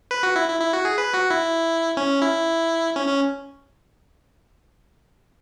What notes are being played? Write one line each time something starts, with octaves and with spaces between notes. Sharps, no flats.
B4
F#4
E4
E4
E4
F#4
G#4
B4
F#4
E4
C#4
E4
C#4
C#4